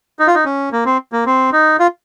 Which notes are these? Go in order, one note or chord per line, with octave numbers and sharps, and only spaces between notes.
D#4
F4
D#4
C#4
A#3
C4
A#3
C4
D#4
F4